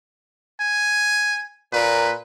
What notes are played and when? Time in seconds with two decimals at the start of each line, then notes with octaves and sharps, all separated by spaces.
0.60 G#5
1.73 A#2 B4